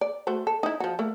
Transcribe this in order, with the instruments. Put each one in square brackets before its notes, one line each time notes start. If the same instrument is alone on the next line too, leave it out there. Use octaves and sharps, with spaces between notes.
[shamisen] D5
A3 F#4 C5
A4
D#4 E4
F3 F#4
A3 A#3